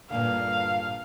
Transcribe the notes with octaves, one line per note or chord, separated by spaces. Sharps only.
G2 A#2 D3 F5